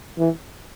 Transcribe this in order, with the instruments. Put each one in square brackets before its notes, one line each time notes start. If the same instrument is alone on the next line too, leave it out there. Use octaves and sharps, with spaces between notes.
[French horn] E3